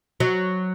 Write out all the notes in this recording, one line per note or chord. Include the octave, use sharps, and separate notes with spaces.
F#3